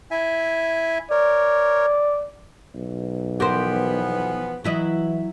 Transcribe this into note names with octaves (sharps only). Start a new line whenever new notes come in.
E4 E5 G#5
A#4 C#5 D5
B1
E3 F3 B3 G4 A#4 C5
E3 F#3 E4 D#5